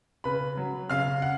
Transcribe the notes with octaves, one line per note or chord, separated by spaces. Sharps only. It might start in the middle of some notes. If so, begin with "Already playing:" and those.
C#3 B4 B5
F#3
C#3 F5 F6
F#5